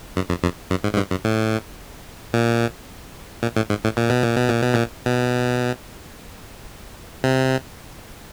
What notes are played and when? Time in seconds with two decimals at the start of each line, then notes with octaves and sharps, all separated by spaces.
0.16 F#2
0.29 F2
0.43 F2
0.71 F#2
0.84 G#2
0.94 G#2
0.97 G2
1.11 F#2
1.25 A2
2.33 A#2
3.43 A#2
3.56 A2
3.70 G#2
3.84 A2
3.97 A#2
4.10 B2
4.23 A#2
4.37 B2
4.49 A#2
4.62 B2
4.74 A#2
5.06 B2
7.24 C3